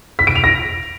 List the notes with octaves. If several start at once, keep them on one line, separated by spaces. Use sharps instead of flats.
B6
D7
F7
A#6